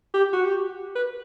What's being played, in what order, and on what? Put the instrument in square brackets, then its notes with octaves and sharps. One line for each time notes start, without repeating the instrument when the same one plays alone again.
[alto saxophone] G4
F#4
G4
B4